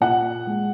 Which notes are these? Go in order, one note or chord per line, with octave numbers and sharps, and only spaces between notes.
A#2 F#5
G#3